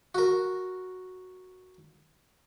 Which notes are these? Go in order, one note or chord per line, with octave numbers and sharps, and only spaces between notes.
F#4 A#4